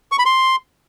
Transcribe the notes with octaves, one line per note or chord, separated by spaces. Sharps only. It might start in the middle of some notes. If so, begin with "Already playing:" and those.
C#6
B5
C6